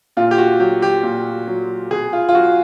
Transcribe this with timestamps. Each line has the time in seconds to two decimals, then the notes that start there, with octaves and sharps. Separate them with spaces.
0.17 A#2 F4
0.31 G4
0.38 F#4
0.60 F#3 G4
0.82 G4
1.03 A#2
1.47 F#3
1.91 B2 G#4
2.13 F4
2.29 F4
2.35 F#3 F#4